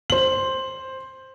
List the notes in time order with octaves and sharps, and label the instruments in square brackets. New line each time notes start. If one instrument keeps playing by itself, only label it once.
[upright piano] C5 F#7